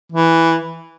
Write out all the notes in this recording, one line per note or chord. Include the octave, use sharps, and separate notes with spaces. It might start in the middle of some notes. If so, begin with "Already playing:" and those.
E3